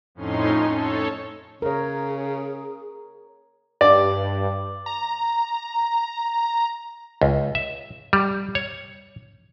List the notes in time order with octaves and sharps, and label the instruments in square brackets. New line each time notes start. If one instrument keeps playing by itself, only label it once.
[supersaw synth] F2 A2 C#4 D#4 C6
A4 C#5
[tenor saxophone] C#3 [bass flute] G#4 [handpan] A#4 C#5
[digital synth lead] G2 [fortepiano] D5
[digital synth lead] A#5
[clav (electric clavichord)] C#2
E5
G3
C#5